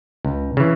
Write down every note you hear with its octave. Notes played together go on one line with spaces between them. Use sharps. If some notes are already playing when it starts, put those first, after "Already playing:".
C#2
C#3 E3